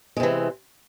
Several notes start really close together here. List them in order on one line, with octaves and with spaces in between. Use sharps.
G#3 C3 E3